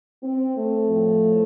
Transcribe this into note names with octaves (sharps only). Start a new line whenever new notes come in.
C4
A3
A2 F3